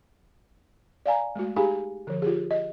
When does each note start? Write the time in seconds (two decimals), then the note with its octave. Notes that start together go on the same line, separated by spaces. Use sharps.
1.06 D5 F5 G#5 A#5
1.35 G#3 A3 F#4
1.56 D#4 G4 G#4 F5 G#5 A#5
2.07 D3 F3
2.22 F4 G4 G#4
2.51 D#5